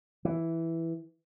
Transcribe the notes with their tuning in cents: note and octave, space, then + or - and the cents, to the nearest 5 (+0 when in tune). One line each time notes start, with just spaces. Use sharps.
E3 +0